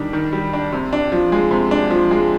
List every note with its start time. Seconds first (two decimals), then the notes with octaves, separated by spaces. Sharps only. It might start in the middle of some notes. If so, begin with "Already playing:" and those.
Already playing: D#3 G3 D4
0.13 D#3
0.33 G3
0.53 D4
0.72 C3
0.93 D4
1.12 F3
1.32 G#3
1.51 C3
1.71 D4
1.90 F3
2.11 G#3